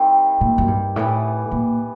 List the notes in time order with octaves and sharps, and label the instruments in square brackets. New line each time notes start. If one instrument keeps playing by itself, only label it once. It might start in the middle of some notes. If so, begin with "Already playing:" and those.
Already playing: [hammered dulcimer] D#3 G3 C4 E4 A#4
[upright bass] A#2
F#2
G2
[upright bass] A2 [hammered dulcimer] E3 G3 B3
[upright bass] A#2